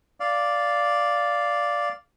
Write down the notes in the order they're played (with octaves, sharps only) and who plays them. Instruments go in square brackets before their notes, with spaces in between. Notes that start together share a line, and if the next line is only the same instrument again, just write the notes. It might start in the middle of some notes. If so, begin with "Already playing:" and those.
[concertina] D5 F5